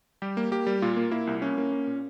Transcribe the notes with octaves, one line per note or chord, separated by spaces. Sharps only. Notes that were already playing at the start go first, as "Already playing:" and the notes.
G3 G4
A#3
A#3 G4
G3
A#2 F4
A#3
A#3 E4
C2
A#3 C#4
A#3
A#3
A#2